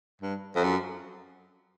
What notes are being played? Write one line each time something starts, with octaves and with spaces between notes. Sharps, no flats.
G2
F2
F#2